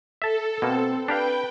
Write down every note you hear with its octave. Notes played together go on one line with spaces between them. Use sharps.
A4 E5 A5
B2 A#3 C4
D4 G4 B4 F5 G5